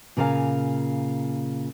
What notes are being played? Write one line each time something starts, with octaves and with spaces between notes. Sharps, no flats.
A#2 C#3 A#4 C#5 F5 G#5